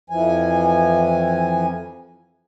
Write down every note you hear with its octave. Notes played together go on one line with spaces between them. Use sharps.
F2 E3 F3 G#5